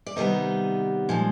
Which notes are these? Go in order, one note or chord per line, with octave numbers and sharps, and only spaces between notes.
D5
C3 D#3 G3 B3 D#4 D#5
A#2 F3 G#3